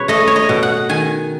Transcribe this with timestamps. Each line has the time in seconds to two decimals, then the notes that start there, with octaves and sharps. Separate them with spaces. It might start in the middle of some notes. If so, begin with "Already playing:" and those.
Already playing: B2 B4 C#5
0.08 A3 D#5
0.27 C#5
0.36 D#5
0.49 B2
0.63 F#5
0.89 D#3 G#5